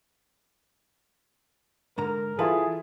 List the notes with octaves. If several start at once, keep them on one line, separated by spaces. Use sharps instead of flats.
G#2 D3 A#4 A#5
E3 E4 F4 G#4 A4 B4